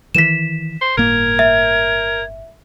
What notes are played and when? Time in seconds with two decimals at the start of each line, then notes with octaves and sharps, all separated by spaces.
0.15 D#3 E3 B6 E7
0.81 C5
0.97 G1 A2 A#3 A#4 G#6
1.39 E5